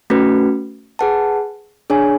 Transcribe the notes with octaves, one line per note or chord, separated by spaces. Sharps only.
A3 C#4 F#4 B4
G#4 B4 F#5 A5
D4 G#4 C#5 G#5